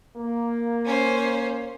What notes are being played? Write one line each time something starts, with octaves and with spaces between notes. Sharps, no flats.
A#3
C#4 C5